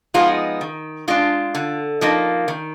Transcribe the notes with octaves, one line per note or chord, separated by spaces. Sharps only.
F3 G#3 B3 D#4 F4
D#3
G#3 D4 F4
D3
F3 A#3 D#4
D#3